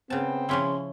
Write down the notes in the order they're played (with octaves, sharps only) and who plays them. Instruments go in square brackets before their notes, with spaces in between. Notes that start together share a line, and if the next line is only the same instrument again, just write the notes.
[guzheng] C#3 A5 [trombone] B3 [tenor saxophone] C4
[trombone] C#3 [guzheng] F3 C#4 E4 [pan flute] C6